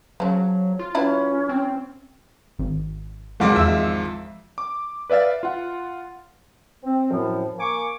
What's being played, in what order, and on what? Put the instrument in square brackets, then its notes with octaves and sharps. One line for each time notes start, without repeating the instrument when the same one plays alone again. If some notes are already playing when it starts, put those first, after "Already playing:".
[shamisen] C#3 F3 [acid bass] F#3
[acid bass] F4
[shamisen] E3 F#3 E4 [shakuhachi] C#4
[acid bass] C4
[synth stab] G#1
[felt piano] G#1 F5 D6 [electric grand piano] G#2 F3 G#3
[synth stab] E2 E5 E6
[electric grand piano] D6
B4 D5 E5 F5 A6
F4 F#5
[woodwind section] C4
F#2 A2 F3
A#3 G#5 C#6 D6